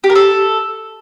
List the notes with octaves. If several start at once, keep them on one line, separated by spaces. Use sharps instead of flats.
G4
A#4
A4